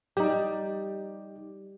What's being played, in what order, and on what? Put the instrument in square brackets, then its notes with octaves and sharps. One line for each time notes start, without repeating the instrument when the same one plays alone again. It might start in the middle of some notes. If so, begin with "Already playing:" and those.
[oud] G3 [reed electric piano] D#4 G4